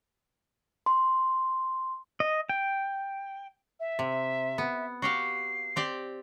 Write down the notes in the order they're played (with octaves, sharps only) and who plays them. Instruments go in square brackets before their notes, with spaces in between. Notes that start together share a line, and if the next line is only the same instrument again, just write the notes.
[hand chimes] C6
[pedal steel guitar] D#5
G5
[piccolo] E5
[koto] C3
B3
[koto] F#4 G4 F5 [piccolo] C7
[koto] C4 G4 D5